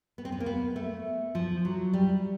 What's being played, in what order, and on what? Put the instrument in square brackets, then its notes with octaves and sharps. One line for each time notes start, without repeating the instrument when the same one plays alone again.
[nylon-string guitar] B3
C4
B3
A#3
B3
A3
F3
F#3
G3